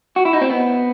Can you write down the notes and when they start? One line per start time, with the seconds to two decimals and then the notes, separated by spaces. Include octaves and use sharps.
0.16 F#4
0.25 E4
0.33 D#4
0.41 C4
0.50 B3